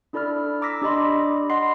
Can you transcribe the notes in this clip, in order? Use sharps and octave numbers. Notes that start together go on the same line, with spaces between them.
D4 E4 A4 D5 B5 F6
A#5 D6 E6 A#6 B6
D4 G4 D5 D#5 B5 C6
D#5 F#5 B5 C6 C7